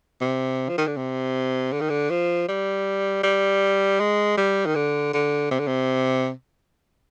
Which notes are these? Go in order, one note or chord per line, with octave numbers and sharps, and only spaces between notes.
C3
F3
D#3
D3
C3
D3
D#3
D3
F3
G3
G3
G#3
G3
D#3
D3
D3
C3
D3
C3